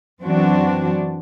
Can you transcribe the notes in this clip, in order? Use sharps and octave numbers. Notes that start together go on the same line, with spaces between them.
F#2 E3 F#3 C4 D4 F#4